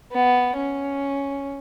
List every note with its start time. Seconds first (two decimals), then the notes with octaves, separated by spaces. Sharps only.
0.12 B3
0.57 C#4